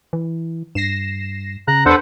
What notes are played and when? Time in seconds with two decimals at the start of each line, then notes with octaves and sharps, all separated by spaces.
0.13 E3
0.75 G2 A#6 C7 E7
1.68 C#3 A#5 F#6
1.86 E2 D4 A4 B4 C5 F#5